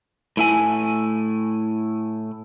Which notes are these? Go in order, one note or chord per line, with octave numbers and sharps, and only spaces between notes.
A2 E4 G#5